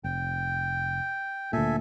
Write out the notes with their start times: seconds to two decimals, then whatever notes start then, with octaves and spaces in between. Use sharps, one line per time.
0.04 F1 G5
1.53 D2 A#2 A4 E5 G#5